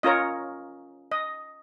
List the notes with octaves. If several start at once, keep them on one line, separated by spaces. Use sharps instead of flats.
C#4 F4 A#4 C#5 D#5
D#5